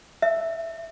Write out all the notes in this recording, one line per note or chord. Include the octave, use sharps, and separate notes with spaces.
E5